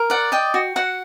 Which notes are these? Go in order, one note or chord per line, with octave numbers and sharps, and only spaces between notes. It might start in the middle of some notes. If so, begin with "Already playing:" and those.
Already playing: A#4
D5 F#5
D#5 G5
F#4
F#4 F#5